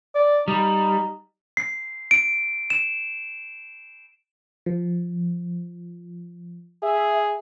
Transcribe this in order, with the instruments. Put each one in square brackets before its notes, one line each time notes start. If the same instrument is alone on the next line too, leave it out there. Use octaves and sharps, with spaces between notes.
[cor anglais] D5
[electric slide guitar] G3 [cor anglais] D#4
[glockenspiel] C7
D7
E7
[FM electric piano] F3
[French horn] G#4 [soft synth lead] E5